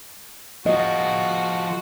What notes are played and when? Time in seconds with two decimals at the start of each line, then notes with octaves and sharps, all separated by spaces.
0.66 F3 F#4 G#4 D#5